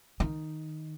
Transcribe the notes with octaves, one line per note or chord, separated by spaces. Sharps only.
D#3